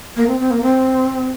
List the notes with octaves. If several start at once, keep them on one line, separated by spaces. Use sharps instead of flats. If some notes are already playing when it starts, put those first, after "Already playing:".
A#3
C4
C4
A#3
C4